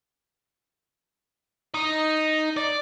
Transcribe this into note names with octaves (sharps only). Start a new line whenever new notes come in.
D#4
D5